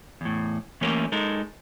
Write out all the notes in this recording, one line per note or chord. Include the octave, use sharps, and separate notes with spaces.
E2 A2
E3 A3 A#3 C#4 G4 A#4
G#3 D#4 A4 A#4